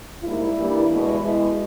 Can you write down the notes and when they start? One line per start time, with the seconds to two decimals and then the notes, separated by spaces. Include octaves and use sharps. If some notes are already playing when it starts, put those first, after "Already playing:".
0.24 G#2 G3 A#3 E4
0.57 G2 E3 G3 A#3
0.89 E2 B2 G#3
1.22 B2 G#3